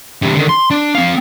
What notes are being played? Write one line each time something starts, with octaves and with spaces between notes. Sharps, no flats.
G2 C3
D3 D#3
C6
D4
C4 F5